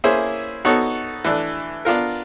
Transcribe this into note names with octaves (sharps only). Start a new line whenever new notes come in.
A#3 C#4 E4 G#4 C5
B3 D#4 F#4 A4 C#5
E3 A3 D4
B3 D4 F4 A#4